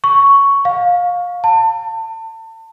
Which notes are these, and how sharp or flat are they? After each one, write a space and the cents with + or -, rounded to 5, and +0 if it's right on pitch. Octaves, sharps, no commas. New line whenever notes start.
C#6 +5
F5 +25
A5 +30